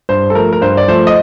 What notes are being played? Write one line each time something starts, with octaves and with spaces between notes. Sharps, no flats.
G2 C5
A4
F3 A3 A#4
A#4
G2 C5
D5
F3 A3 C5
D#5